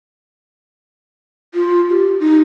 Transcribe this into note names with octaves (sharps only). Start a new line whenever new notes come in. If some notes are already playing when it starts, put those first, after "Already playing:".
F4
G4
D#4